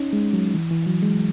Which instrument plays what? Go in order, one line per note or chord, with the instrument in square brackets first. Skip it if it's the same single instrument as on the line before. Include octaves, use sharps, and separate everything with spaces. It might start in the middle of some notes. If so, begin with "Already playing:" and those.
Already playing: [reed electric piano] C#4 D#4
G#3
F#3
E3
E3
F#3
G#3